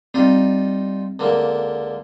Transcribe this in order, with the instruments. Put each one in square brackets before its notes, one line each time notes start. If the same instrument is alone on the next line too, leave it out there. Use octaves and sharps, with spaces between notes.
[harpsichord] G3 D#4 F4 [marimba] C4
[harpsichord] C#2 D3 A#3